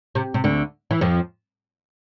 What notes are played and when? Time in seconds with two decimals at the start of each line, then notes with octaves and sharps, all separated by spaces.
0.15 C3
0.34 C3
0.44 D2 D3
0.91 E3
1.01 F2 F3